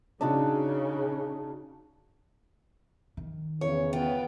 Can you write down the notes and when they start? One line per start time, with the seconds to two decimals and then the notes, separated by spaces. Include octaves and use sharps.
0.21 C#3 D4 D#4 F#4
3.17 D#3
3.61 E2 C#3 C#5
3.93 B3 F4 G5